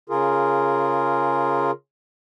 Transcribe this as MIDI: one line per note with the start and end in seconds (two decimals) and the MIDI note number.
0.09 1.71 49
0.09 1.71 65
0.09 1.71 68
0.09 1.71 70